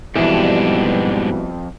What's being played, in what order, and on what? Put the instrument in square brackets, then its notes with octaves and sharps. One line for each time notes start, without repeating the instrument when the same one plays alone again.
[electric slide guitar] F2 [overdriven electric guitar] G#2 D4 [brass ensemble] B2 G3 [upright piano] E3